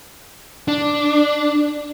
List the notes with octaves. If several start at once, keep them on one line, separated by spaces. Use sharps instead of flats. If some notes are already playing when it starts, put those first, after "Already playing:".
D4